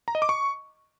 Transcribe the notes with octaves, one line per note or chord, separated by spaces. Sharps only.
A#5
D#5
D6
C#6